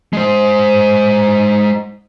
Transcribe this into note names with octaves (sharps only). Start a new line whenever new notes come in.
G#3 C5